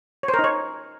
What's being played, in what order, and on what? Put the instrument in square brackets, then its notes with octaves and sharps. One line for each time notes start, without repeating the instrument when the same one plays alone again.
[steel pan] C#5
C5
A#4
D#4
C#5